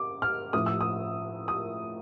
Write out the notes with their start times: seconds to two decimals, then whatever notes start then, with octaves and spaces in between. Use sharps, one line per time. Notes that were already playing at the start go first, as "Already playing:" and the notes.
Already playing: D6
0.22 F6
0.53 A2 F3 D#6
0.66 E6
0.81 D#6
1.48 D#6